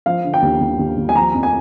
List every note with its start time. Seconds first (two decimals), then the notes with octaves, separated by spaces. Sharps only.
0.06 F3 F5
0.24 D3
0.34 G5
0.42 D#2
0.61 D#2
0.79 D#2
0.97 D#2
1.09 G#5
1.15 F3 A#5
1.34 F2
1.43 G#5